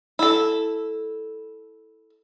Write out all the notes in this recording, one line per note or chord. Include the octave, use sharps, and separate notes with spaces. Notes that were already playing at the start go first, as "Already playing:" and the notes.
E4 A4